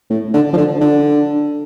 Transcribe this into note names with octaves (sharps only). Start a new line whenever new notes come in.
A2
D3
F3
D3
D3